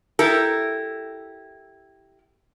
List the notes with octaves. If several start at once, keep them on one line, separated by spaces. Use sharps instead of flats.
E4 G4 A4 A#4